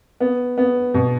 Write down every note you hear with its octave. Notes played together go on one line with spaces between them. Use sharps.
B3
B3
B2